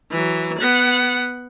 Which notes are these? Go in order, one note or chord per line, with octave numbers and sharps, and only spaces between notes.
E3 F#3
B3 F#5